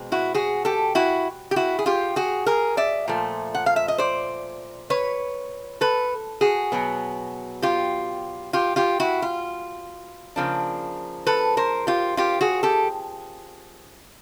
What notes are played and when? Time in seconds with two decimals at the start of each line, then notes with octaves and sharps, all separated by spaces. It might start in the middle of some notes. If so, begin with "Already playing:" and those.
Already playing: B2 G#3 C4
0.12 E4 F#4
0.35 F#4 G#4
0.65 G4 A4
0.95 E4 F#4
1.51 G4
1.56 E4 F#4
1.79 G#4
1.86 F4 G4
2.16 F#4 G#4
2.46 G#4 A#4
2.77 D5 E5
3.08 A#2 F3 A3
3.55 F#5
3.66 F5
3.76 E5
3.88 D#5
3.98 C5 D5
4.90 B4 C#5
5.81 A4 B4
6.41 F#4 G#4
6.72 B2 F#3 B3
7.62 F4 G4
8.53 F4 G4
8.76 F4 G4
9.00 E4 F#4
9.22 F4
10.36 C#3 F3 A#3 D4
11.27 A4 B4
11.57 A#4 C5
11.87 F4 G4
12.17 F4 G4
12.41 F#4 G#4
12.63 G4 A4